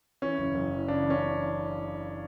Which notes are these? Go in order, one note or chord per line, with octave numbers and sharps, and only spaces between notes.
E3 C#4
F#1
F#1
E3
C#3 D4
E3
C#4